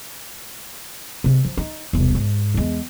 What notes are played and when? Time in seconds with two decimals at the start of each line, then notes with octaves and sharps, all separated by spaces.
1.24 C3 G#3
1.45 F3
1.57 D#4
1.93 E1 C2
2.15 G#2
2.55 E2 G#3